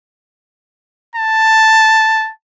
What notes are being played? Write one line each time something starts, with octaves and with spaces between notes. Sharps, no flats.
A5